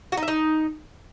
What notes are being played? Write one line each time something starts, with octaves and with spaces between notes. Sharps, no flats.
F#4
D#4
E5
D#4